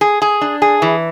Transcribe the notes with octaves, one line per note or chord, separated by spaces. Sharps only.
G#4
G#4
D4
G#4
E3